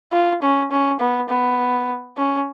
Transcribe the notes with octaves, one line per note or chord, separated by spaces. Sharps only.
F4
C#4
C#4
B3
B3
C#4